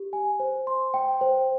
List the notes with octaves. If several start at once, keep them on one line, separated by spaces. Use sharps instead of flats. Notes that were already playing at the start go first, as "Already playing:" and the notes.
Already playing: G4
G#5
C5
C6
G5
C5